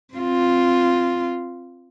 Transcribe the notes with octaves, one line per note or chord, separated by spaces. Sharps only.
C4 F4